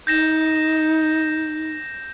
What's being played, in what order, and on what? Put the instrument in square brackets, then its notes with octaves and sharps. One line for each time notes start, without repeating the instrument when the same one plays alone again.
[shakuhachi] D#4 [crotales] G6 A#6 E7